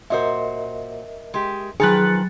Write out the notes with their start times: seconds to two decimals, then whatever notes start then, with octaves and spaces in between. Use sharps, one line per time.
0.10 A#2 F#4 A#4 C5 D#5 E5
1.34 G#3 G4
1.80 D#3 F3 F#3 G#4 B4 F#6 A6 C#7